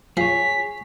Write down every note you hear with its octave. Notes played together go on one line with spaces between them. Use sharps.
F3 G#4 C#5 B6